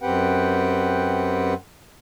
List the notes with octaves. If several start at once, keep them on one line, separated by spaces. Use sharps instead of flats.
F#2 C4 G4 B4 F#5 G5